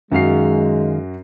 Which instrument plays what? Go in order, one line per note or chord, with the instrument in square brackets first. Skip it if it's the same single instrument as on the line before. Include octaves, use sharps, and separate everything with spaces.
[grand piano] F#2 F#4 C7 [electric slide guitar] D#3 D#4 F5 [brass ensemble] G#3